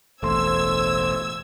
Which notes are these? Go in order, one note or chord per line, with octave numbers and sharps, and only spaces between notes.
E1 A1 A4 C5 C6 E6 G#6